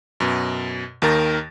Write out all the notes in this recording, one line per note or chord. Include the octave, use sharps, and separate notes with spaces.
F#2 B2
D#2 D#3 A#4 A6 A#6